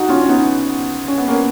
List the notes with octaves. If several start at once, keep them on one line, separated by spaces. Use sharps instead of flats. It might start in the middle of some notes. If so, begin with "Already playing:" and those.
Already playing: D#4 F#4
C#4 F4
C#4
B3 D#4
C#4
B3
A#3 C#4